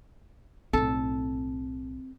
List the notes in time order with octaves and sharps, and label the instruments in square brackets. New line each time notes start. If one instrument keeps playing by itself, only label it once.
[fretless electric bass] B1 A2 [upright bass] C4 [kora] A4